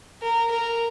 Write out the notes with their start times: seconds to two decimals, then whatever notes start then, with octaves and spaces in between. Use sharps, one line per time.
0.21 A#4
0.50 A#4